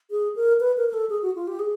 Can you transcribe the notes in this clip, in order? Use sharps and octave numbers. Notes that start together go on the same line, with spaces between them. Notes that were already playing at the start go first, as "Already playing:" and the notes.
G#4
A#4
B4
A#4
A#4
A4
G#4
F#4
F4
G4
G#4